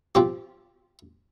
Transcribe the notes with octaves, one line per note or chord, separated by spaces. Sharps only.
F3 C4 G4